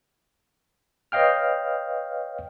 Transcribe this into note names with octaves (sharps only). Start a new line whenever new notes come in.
B4 C#5 D#5 F5 G5 F6